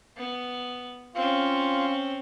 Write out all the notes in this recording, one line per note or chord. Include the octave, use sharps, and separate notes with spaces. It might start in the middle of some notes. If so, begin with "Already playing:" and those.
B3
C4 C#4 F4 F5